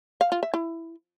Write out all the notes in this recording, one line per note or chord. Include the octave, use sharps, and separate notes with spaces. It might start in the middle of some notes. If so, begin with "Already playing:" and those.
F5
F4
E5
E4